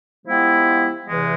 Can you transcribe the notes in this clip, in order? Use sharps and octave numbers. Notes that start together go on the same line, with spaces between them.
F3 G#3 B3 E4 G4
E2 C3 E3 G#3